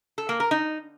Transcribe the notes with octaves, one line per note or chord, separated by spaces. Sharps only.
A4
A#3
A#4
D#4